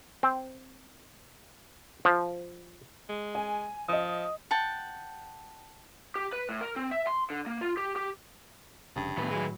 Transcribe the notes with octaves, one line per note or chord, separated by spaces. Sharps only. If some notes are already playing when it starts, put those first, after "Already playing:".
C4
F3
G#3
G#5
F3 D#5 D#6
F#5 G5 A5
G4
B4
A2
A#4
C4
E5
C6
D3
A#3
F4
G4
G4
F1 G2 C#3
A2 D#3 B3 B4
A2 F#3 G#3